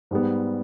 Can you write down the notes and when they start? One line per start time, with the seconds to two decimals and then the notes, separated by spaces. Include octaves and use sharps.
0.11 G#2 G3 B3